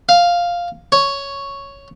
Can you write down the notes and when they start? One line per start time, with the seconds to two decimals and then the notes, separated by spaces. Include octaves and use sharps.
0.09 F5
0.92 C#5